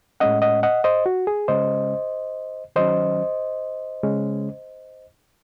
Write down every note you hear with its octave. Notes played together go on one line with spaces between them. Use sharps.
A2 G#3 C#4 D#5 F#5
D#5 F#5
D#5 F#5
C5 D#5
F#4
G#4
C#3 G#3 C#4 C5 D#5
D#3 F#3 C#4 C5 D#5
C#3 G#3 C#4